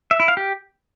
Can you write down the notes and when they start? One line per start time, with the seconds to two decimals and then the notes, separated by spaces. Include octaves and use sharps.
0.11 E5
0.20 E4
0.28 F5
0.37 G4